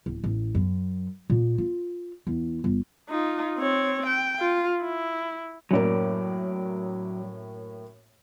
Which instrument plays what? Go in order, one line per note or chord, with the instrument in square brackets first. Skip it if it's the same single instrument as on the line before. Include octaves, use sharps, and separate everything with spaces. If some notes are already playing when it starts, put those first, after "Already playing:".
[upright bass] D1
A1
F#2
A#2
F4
E2
G1
[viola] D#4 F4
C4 C#5
G5
F4
E4
[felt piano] F#2 A2 A#3 [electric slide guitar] F#3 D5